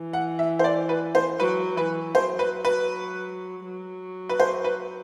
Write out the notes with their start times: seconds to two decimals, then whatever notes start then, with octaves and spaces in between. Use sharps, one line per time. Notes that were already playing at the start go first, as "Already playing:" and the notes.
Already playing: E3
0.13 F#5
0.39 E5
0.59 C5
0.64 D5
0.89 B4
1.15 C5
1.40 F#3 B4
1.76 E3 B4
2.14 F#3 C5
2.39 B4
2.65 B4
3.65 F#3
4.29 B4
4.40 C5
4.64 B4